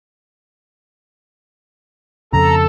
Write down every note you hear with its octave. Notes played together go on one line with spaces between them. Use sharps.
F2 C#3 A4 A#5